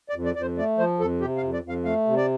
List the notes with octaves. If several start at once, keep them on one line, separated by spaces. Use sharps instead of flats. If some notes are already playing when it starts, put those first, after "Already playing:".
D5
F2
D5
F2 D5
C5
A3 D5
F3 C5
F2 A4
C3 G4
F5
F2
D5
F2
F5
A3 F5
C3
D5